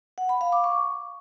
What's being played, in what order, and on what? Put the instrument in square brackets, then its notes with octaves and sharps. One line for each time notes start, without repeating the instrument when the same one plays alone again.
[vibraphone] F#5
B5
F5
D6
C#6